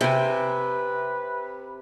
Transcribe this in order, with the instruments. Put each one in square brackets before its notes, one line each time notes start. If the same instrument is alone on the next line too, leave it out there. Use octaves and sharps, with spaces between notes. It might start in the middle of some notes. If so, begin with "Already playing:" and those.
[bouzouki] C3 [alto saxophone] B4 [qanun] E5 G5 G#5